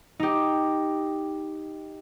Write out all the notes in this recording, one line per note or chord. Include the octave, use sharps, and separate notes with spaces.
D#4 G4